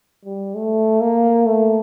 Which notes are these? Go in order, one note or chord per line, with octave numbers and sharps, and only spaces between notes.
G3
A3
A#3
A3